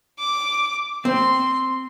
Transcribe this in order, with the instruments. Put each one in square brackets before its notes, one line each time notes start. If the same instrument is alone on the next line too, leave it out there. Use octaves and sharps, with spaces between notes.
[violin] D6
[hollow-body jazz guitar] C4 [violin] C6